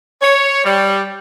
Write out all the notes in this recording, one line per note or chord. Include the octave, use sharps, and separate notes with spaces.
C#5
G3